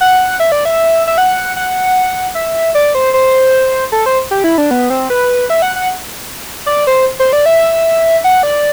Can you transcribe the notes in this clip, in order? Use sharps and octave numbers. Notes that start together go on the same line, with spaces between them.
F#5
E5
D5
E5
E5
F#5
F#5
E5
D5
C5
C5
A4
C5
G4
E4
D4
B3
C4
B4
E5
F#5
F#5
D5
C5
C5
D5
E5
F#5
D5